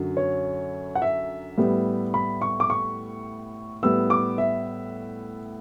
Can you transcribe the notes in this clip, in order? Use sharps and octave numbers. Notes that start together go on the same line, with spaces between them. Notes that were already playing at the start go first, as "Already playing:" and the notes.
Already playing: F#2 D3 F#3
C#5
F#5
E5
A2 G3 B3
B5
C#6
D6
C#6
A2 G3 B3 E6
D6
E5